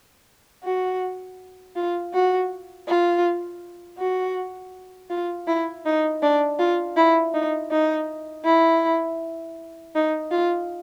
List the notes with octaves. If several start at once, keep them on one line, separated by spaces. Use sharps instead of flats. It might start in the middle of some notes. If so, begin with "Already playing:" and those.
F#4
F4
F#4
F4
F#4
F4
E4
D#4
D4
F4
E4
D#4
D#4
E4
D#4
F4